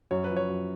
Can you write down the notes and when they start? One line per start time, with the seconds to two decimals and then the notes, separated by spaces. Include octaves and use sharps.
0.11 F#2 C#5
0.24 B4
0.30 F3
0.36 C#5
0.49 F#2